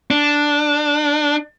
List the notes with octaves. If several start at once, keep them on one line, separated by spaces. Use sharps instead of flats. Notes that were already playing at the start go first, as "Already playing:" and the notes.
D4